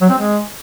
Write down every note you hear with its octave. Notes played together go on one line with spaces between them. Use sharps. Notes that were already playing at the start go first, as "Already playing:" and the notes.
F#3
C4
G#3